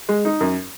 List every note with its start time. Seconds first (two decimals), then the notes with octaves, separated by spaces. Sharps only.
0.09 G#3
0.25 D#4
0.41 F#2